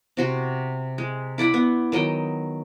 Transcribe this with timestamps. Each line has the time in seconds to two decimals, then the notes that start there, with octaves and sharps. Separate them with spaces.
0.17 C3 F#4 C6
0.98 G#3
1.38 E4 D5 F#5 B5
1.54 B3
1.92 D#3 F#3 D#5 G5